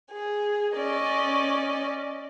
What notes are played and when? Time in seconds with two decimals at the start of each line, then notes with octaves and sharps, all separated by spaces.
0.10 G#4
0.76 C#4 D5 D#5